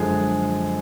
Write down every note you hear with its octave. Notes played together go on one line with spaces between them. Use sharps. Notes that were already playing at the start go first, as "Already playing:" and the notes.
Already playing: F#2 D3 F3 G#3 G#4